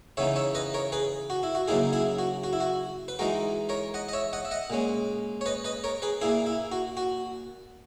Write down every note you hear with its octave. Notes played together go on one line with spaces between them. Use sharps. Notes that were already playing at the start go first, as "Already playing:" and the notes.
C#3 E3 B3 D#4 C#5 E5
C#5 E5
B4 D#5
A#4 C#5
G#4 B4
F#4
E4
F#4
C#3 F#3 A#3 D#4 E4 G#4
E4 G#4
F#4
F#4
E4
F#4
B4
E3 G#3 D#4 F#4 A#4
A#4 C#5
D#5 F#5
D#5
C#5 E5
D#5 F#5
E5
D#5 F#5
A#2 G#3 C#4
C#5
B4 D#5
B4 D#5
A#4 C#5
G#4 B4
A#2 A#3 E4 G#4
E4
F#4
F#4